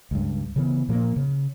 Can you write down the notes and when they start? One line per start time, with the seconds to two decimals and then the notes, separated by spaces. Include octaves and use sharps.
0.11 C#2 G2
0.56 C#3 E3 B3
0.89 A#2 F3 A#3
1.16 C#3